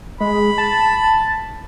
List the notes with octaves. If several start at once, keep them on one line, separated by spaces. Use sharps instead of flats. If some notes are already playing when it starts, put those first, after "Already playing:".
G#3 B5
A5